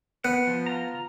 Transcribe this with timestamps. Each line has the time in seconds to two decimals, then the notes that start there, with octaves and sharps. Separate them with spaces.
0.25 B3 F#5
0.47 F3
0.66 F4 A#5